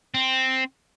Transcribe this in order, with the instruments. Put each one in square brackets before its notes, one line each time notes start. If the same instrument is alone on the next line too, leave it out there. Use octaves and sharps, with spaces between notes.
[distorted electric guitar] C4